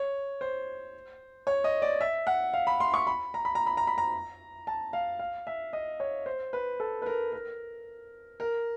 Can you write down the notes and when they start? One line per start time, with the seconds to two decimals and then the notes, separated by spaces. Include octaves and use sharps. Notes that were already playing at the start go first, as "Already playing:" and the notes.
Already playing: C#5
0.41 C5
1.47 C#5
1.64 D#5
1.82 D5
2.01 E5
2.27 F#5
2.54 F5
2.67 B5
2.80 C6
2.94 C#6
3.07 B5
3.34 A#5
3.45 B5
3.55 A#5
3.66 B5
3.77 A#5
3.87 B5
3.98 A#5
4.67 A5
4.93 F5
5.19 F5
5.47 E5
5.73 D#5
6.00 C#5
6.26 C5
6.53 B4
6.80 A4
7.02 B4
7.06 A#4
7.32 A#4
8.40 A#4